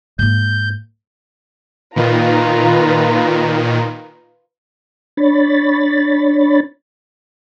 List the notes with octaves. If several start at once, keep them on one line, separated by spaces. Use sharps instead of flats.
G#2 A#3 G6
A#2 D#3 F4 B4 A#5
D4 C#5 B5 A6